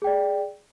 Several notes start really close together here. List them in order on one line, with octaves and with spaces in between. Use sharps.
G#4 G5 D5